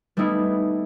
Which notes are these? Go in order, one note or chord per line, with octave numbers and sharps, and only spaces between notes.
G3 A3 B3 D#4 E4